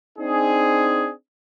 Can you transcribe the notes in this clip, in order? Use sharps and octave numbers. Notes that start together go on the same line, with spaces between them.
C4 D4 D#4 G#4